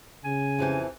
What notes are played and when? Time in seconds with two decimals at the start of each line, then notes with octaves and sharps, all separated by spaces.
0.25 C#3 G#5
0.59 F2 E3 G4